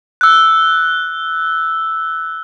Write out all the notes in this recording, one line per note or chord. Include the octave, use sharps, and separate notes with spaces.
E6 F#6